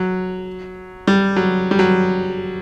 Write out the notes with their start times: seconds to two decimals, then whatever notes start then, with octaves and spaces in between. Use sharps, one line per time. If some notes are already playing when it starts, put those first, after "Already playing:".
Already playing: F#3
1.07 G3
1.36 F#3
1.71 G3
1.79 F#3